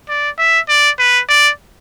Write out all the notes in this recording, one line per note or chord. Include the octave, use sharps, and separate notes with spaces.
D5
E5
D5
B4
D5